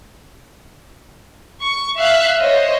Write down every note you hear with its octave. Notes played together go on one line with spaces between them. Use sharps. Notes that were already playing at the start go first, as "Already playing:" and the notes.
C#6
E5 F5 F#6
C5 C#5 D#5